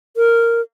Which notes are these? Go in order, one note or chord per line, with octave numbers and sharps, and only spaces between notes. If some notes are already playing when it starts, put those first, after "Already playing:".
A#4